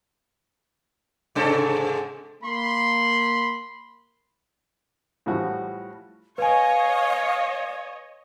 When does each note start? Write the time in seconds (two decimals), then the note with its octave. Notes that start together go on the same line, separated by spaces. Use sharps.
1.35 G#2 C3 A4
2.43 A#3 B5 C6
5.26 A2 E3 F3 G3 F#4
6.38 B4 C#5 D#5 F5 G#5